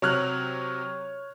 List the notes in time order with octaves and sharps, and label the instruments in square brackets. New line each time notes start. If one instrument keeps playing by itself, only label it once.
[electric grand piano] C3 F#3 [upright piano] C#5 F6 F#6